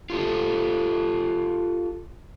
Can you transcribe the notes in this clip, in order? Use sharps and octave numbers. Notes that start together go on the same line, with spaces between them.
F4 G4 A4